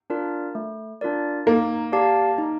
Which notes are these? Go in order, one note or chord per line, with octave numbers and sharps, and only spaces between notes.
D4 F4 A#4 D5
A3
D4 F4 A#4 D5
A#3 D#4
G4 D5 F5 A5
D#4